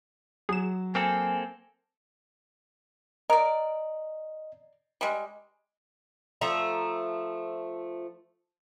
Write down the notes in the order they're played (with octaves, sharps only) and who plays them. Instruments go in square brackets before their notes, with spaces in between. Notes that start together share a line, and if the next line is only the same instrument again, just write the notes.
[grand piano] F#3 [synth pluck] G#4 E7
[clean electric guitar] A#3 C4 A4 [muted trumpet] G#5
[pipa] A#4 D5 [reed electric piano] D#5
[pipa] G3 G#3
[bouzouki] F3 A3 E5 A#5